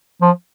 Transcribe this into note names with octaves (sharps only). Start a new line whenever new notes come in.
F3